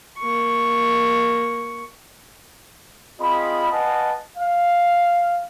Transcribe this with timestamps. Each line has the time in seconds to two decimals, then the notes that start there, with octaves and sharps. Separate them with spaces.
0.19 A#3 C#6
3.20 C4 F4 G#4 D#5 B5
3.71 B4 D#5 F5 F#5 G#5 A5
4.36 F5